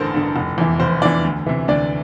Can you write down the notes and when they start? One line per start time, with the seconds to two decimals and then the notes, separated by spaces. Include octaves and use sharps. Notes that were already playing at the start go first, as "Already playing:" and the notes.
Already playing: A1 G2 D3 A4 A#4 C5 A5
0.14 G2 D3
0.36 F1
0.58 E2 E3
0.80 F1 C5
1.02 E2 D4 D5
1.05 E3
1.24 D2
1.46 C3 E3
1.68 D2 D4 D5